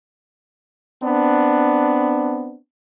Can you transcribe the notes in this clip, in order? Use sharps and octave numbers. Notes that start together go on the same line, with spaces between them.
B3 C4 D4